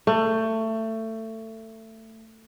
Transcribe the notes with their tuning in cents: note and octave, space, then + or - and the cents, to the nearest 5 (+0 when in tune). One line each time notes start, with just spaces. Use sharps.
A3 +20